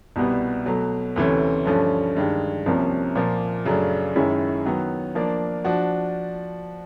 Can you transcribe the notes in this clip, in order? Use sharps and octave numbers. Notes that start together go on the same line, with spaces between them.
C2 B2 G3 B3
B2 F#3 A3
D2 C3 E3 A3 C#4
G2 D3 F3 A3 C#4
G2 D#3 G#3
C2 C3 F3 A#3 C#4
A#2 F3 A#3
F#2 C#3 F#3 A3 D4
F#2 D#3 G#3 C#4 E4
D#3 F#3 B3
F3 A#3 D4
F3 D4 F#4